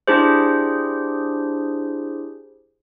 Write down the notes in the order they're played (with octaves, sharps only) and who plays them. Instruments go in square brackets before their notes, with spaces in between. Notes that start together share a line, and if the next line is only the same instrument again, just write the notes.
[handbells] D4 E4 G4 G#4 C5